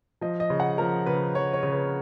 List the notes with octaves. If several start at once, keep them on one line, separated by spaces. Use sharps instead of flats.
F3 D#5
D#5
C#3
F#5
F3 A#4
C#3 B4
F3 C#5
C#5
C#3
B4